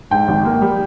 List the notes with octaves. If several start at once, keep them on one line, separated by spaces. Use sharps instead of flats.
G#2 G5
G#1
A#3
G3